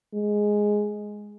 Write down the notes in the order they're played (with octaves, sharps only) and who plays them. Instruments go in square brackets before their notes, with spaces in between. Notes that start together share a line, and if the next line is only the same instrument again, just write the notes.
[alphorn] G#3